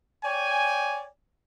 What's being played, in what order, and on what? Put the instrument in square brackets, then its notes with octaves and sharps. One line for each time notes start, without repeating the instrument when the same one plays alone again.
[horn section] C#5 D5 G5 G#5